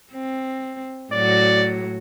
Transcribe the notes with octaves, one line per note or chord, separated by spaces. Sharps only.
C4
A2 F#3 F#4 D5